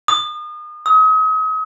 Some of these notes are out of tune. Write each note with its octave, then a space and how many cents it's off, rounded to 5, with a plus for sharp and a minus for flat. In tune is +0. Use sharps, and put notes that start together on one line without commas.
D#6 -35
D#6 +40